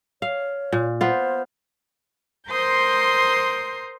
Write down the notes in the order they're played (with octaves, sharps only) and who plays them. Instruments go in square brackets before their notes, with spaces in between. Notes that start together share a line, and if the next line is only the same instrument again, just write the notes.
[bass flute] C#5 [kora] F5
[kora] A#2
[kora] B3 F4 [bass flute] C5
[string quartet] A#4 C5 C6 D#6 G6